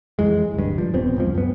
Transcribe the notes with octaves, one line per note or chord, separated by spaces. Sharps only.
F2 E3 G#3
D1 G2
F3
D#1 F2 B3 C4
F#1 C#2 F3
F#2 B3